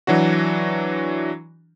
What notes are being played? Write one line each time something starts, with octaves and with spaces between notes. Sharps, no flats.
E3 F#3 D4 F#4